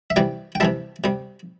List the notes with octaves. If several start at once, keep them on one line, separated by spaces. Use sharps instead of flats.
E5
C3 E3 G3 D5 G5
G5
C3 E3 G3 E5 A5
C3 G3